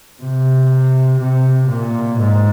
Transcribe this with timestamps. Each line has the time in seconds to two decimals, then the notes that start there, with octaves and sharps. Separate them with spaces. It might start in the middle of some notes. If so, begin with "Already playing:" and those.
0.22 C3
1.21 C3
1.70 A#2
2.19 G#2